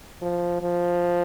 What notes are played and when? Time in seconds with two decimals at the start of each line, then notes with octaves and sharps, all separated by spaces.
0.22 F3
0.62 F3